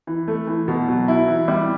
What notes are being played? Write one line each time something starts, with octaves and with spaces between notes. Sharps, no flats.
E3
A3
E3
B2
F#3
E4
E3
G3